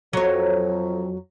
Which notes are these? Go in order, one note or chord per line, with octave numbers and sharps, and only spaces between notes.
F2 F#3 C#5